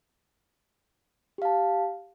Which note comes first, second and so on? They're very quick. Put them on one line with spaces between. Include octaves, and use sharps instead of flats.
G4 F5 A5